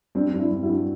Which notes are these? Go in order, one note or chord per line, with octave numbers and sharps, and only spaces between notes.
G2 C4 D4
G2
D4 E4
G2
E4 F#4
G2